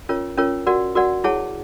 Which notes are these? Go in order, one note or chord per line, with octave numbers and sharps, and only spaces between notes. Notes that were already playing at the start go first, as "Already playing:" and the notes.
C#4 F4 A#4 C#5
C#4 F4 A#4 C#5
F#4 A#4 D5 F#5
F#4 A#4 D5 F#5
E4 G#4 C#5 F#5 A5